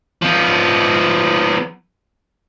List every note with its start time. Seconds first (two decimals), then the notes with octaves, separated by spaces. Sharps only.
0.22 F3 B3